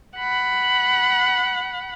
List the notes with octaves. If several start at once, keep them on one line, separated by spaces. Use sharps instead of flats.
F#5 B5